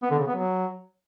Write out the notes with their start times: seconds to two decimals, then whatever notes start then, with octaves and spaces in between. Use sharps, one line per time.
0.02 B3
0.11 D3
0.19 C#3
0.27 B3
0.35 F#3